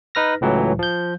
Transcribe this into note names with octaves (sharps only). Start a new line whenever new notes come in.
D#4 B4 F6 A#6
C#2 A2 E3 F#3
F3 G6